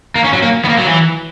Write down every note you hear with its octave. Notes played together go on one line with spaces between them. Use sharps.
A#3
C#4
F#3
A#3
B3
A#3
F#3
E3